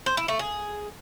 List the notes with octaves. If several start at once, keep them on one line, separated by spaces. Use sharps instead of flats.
C5
E4
A3
G#4